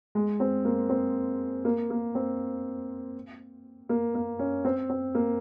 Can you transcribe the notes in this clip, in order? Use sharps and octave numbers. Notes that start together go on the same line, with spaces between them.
G#3
C4
A#3
C4
A#3
A#3
C4
A#3
A#3
C#4
C4
C4
A#3